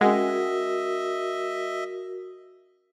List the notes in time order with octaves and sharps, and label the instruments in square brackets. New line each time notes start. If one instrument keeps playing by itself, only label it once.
[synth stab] G#3 [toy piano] C#4 F#5 [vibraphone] F#4 A#4 [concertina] D#5 E5